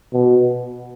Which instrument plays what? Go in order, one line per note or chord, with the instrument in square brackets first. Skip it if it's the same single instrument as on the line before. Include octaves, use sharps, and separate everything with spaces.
[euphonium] B2